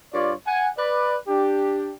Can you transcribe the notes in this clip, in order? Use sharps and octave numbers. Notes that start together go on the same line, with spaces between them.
G2 F4 C#5 D5
F#5 G#5
B4 D5
D4 G4